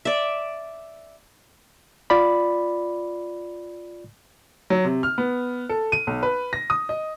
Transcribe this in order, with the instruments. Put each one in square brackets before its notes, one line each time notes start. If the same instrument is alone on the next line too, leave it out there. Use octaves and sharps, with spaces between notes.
[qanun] D5 E5
[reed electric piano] F4 D5 B5
[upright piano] F#3
C3
F6
B3
A4
D#7
B1
B4
A#6
D#6
D#5